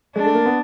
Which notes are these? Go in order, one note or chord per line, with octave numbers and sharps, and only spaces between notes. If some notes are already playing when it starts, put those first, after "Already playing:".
G#3 D4
A3
A#3
B3